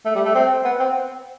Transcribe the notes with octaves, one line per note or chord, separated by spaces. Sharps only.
A3
G3
A3
C4
B3
C4